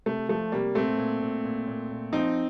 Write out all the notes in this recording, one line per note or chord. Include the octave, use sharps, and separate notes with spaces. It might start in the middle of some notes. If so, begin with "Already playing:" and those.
C3 A3
F3 A3
C3 G3 A#3
A#2 A3 C4
A#2
A#2
A#2
A#2
A#2
F3 C4 D#4